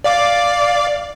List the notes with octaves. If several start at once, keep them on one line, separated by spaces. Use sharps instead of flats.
D5 F5 D6